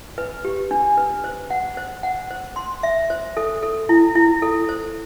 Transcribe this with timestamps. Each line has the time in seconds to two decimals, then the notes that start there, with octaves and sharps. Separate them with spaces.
0.18 B4
0.45 G4
0.71 D4
0.97 B4
1.24 C5
1.50 F#5
1.77 C5
2.03 F#5
2.31 C5
2.56 C6
2.83 E5
3.10 C5
3.37 A4
3.63 A4
3.89 E4
4.15 E4
4.42 A4
4.69 C5